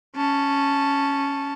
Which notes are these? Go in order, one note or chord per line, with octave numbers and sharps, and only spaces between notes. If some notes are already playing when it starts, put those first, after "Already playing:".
C#4 A5